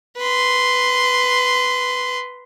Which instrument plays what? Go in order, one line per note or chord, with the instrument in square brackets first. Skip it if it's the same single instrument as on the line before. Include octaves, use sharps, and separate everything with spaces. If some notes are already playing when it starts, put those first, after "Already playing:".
[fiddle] B4 C6